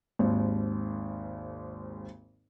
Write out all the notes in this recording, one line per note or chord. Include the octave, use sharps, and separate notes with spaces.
G#1 D#2 G#2